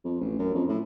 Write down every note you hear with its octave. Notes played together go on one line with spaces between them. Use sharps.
F2
A1
F#2
F2
A2